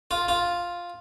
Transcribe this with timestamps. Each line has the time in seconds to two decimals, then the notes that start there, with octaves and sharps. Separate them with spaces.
0.11 F4
0.28 F4